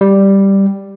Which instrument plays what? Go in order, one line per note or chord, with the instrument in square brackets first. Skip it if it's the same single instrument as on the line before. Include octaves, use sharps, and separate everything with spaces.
[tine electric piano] G3